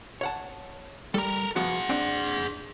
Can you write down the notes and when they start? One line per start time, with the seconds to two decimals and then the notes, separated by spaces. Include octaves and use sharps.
0.21 C#5 F#5 A5
1.14 G3 A4 A#4
1.56 F3 B3 F#4 G#4 F#5
1.89 C4 D4